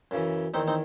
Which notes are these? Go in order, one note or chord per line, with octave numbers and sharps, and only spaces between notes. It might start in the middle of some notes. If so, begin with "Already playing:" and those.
F#2 C#3 E3
E2 D#3 C4 D#4
C4 D#4